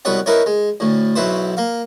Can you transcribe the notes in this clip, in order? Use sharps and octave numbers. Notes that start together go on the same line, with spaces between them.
C2 B2 B4 C#5 F#5
D#4 E4 A#4 B4 C#5
G#3
D2 A2
B1 F#3 E4 B4 C5
A#3 F5